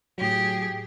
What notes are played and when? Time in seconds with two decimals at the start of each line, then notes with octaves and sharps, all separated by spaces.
0.18 A2 F#3 G4 G#4